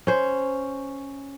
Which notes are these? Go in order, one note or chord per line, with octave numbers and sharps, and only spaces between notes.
C#4 C5